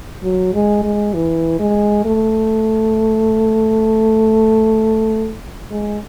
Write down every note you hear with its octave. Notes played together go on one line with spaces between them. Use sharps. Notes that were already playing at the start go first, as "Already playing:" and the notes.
F#3
G#3
G#3
E3
G#3
A3
G#3